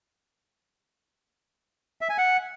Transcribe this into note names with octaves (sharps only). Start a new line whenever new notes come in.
E5
G#5
F#5